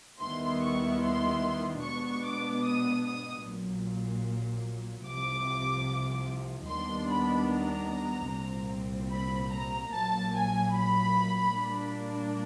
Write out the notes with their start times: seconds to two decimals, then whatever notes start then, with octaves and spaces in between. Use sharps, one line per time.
0.21 D#2 D#3 G3 B3 E4 C6
0.62 C#6
1.02 C6
1.83 B2 G#3 B3 D4 C#6
2.23 D6
2.64 D#6
3.04 D#6
3.45 A#1 A#2 F#3
5.07 C2 C3 F3 D6
6.69 D#2 D#3 G3 B3 D4 C6
7.09 B5
7.50 A#5
8.31 C2 A#2 G3 C4
9.12 B5
9.52 A#5
9.93 A#1 A#2 F#3 A#3 A5
10.34 G#5
10.74 B5
11.55 A#2 G3 A#3 D4